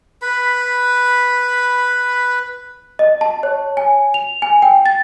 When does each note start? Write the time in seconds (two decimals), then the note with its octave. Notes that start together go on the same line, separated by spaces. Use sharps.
0.22 B4 B5
2.99 D#5
3.21 A5
3.43 C#5
3.77 G#5
4.14 F7
4.42 G#5
4.62 G5
4.86 A6